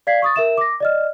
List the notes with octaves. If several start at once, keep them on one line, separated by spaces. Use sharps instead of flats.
D5 F5 G#6 B6 C7
C#6 D#6 A6
A#4 E5 E7
D6 A#6
D5 D#5 F6